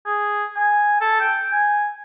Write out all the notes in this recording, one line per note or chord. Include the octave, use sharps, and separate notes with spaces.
G#4
G#5
A4
G5
G#5